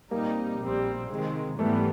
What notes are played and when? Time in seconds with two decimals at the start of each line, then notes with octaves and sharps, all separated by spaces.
0.11 A#2 G3 A#3 C4 D#4
0.61 A#1 A#2 G3 C4
1.09 C3 D#3 G#3 C4
1.59 G#2 E3 G3 A3 B3